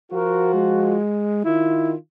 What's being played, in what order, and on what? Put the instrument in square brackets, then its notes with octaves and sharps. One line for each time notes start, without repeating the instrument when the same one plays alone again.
[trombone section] F3 F4 F#4 [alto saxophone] A#4
[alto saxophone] G#3
[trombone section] D#3 F4 [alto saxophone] E4